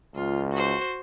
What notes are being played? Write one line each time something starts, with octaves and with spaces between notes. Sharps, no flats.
C#2 F4
F#4 C5